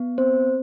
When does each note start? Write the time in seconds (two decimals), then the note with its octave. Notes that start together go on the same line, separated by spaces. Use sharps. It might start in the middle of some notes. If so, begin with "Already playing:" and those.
Already playing: B3
0.18 C4 C5